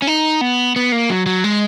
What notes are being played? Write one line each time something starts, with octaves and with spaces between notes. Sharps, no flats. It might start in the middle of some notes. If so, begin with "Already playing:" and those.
C#4
D#4
B3
B3
A#3
F#3
F#3
G#3